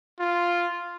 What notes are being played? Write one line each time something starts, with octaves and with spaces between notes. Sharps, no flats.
F4